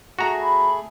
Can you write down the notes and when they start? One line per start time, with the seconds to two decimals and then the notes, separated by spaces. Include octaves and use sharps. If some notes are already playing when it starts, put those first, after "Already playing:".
0.19 A3 F#4 G#4 A#5
0.42 B5